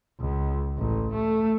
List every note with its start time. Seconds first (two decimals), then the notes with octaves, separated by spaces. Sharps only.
0.20 C#2
0.78 A1
1.13 A3